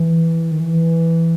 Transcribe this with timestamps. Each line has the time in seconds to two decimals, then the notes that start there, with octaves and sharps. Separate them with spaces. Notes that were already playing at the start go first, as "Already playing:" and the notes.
Already playing: E3
0.52 D#3
0.60 E3